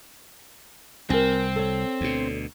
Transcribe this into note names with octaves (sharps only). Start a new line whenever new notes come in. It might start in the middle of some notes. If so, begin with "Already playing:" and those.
C2 C4 A#4 G#5
A4 C#5
D2 B2